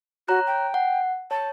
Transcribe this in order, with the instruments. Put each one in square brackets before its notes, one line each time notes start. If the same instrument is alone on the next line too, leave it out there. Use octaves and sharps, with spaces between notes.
[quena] F#4 [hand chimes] C#5 A#5 F#6
[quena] G5
[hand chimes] F#5
[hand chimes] C#5 [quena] A5